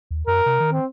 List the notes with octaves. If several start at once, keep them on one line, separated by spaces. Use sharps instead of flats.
D#2
F#2 A#4
C3
D#3
C4